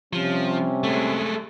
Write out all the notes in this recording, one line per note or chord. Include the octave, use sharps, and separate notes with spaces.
C3 F3 G3 C#4
G#3 A3